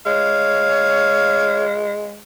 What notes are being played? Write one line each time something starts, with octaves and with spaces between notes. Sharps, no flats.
G#3 C#5 F5